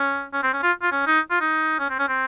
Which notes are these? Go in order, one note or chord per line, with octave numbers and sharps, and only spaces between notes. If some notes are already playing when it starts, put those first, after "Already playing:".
Already playing: C#4
C#4
C4
C#4
F4
F4
C#4
D#4
F4
D#4
C#4
C4
C#4
C4